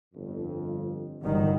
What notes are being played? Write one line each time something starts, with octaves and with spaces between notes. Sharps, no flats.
G1 F2
G1 D3 D#3 F#3 G3